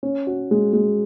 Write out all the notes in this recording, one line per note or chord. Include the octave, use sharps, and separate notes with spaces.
C#4
F#4
G#3
G#3